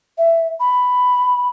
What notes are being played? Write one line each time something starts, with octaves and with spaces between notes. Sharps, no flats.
E5
B5